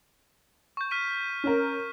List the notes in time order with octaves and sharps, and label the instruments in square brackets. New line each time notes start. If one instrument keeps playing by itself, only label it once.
[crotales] C#6 G6
F6 B6 D#7
[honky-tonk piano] C#4 A#4